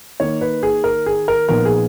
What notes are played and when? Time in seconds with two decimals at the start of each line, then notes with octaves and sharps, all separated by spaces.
0.20 D#3 A#3 D#4 C#5
0.41 B4
0.63 G#4
0.84 A#4
1.06 G#4
1.28 A#4
1.49 A#2 F3 B3 D#4 A#4
1.65 G#4